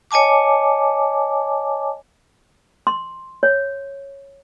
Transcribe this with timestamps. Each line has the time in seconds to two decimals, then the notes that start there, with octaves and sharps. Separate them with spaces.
0.11 C#5 D#5 G#5 A5 D6
2.87 C6
3.43 C#5